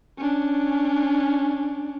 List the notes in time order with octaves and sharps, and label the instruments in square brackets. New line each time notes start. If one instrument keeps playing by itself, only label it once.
[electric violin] C#4 D4